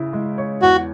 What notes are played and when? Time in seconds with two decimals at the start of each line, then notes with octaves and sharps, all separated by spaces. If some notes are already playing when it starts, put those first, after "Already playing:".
Already playing: C#3 E4
0.13 G#3
0.38 C#5
0.62 E2 F#4